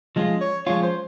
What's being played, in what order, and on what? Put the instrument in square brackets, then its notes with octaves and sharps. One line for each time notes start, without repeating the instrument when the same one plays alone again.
[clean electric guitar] F3 G#3 C#4 F4 [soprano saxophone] D#5
[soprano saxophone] C#5
[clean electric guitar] F3 G#3 C#4 F4 [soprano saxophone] C#5
[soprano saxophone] C5